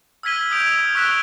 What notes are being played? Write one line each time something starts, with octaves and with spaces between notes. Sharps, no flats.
E6 F6 G#6 B6 D#7 G7
D#6 G6 G#6 D7 F7
E6
C#6 E6 F#6 B6 E7 G7